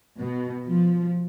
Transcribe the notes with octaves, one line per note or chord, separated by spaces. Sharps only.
B2
F3